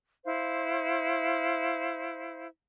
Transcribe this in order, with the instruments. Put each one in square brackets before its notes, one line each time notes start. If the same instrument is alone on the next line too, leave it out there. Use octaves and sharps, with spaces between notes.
[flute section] E4 C5 F5